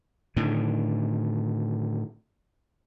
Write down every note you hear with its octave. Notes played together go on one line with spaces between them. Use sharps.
A2 D3 D#3